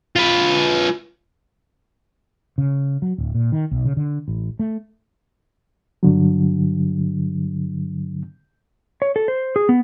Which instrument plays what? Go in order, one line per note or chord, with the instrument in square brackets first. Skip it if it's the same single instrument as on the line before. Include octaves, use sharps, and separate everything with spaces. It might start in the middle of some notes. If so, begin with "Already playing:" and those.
[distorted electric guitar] F4 B4
[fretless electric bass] C#3
F#3
D1
A#2
D#3
B1
C#3
D3
A1
A3
[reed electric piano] G2 D3 F#3
[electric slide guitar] C#5
A4
C5
G#4
B3